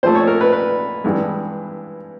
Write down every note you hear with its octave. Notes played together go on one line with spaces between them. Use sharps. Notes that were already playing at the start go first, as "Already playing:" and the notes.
A#2 F3 A3 C5
C#5
A#4
B4
B4
G2 E3 G#3